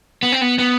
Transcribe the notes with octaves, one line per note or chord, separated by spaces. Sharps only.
B3
C4
B3
B3